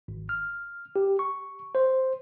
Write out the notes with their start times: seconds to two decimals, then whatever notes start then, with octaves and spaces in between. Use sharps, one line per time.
0.08 G#1
0.29 F6
0.96 G4
1.19 C#6
1.75 C5